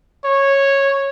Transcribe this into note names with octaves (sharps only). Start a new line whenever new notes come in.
C#5